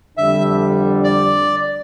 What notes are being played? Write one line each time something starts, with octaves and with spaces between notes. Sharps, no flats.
F2 D3 G3 D4 E5
D5